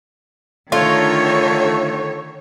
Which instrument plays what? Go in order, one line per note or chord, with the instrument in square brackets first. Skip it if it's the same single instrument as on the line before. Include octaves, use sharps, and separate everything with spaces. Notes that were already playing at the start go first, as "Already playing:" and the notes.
[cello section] D3 D#3 C#5 [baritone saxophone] A3 [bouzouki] F4